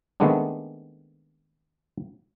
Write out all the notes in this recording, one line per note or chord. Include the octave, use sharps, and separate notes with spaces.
D#3 G#3 A3 B3 C4 D4